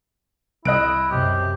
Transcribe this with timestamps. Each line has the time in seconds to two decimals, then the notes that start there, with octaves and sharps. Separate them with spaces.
0.65 C2 E4 D#5 F#6 D7
1.11 F#2 C3 G4